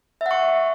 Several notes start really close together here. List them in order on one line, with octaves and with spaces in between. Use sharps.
E5 F#5 C#6